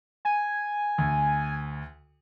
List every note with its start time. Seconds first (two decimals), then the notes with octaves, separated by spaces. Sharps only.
0.25 G#5
0.98 D2